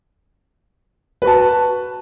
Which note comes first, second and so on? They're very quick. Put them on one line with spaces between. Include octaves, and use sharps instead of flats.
B4 F#4 A5